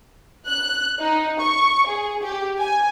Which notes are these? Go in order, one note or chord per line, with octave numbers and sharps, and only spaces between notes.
F#6
D#4
C#6
G#4
G4
G#5